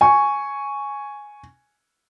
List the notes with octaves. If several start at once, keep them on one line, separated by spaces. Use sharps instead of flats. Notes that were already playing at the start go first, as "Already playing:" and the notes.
G#5 C#6